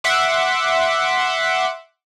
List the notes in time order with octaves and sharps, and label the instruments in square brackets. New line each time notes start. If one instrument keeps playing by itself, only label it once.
[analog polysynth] E5 F#5 C6 D6